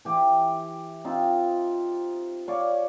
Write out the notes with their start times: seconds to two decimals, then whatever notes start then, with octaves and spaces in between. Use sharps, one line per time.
0.05 E3 G4
1.04 C4 D#4 F4
2.48 C#5 D5 F5 C#6